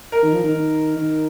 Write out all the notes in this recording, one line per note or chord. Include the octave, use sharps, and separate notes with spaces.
A#4
D#3
F3
D#3
D#3
D#3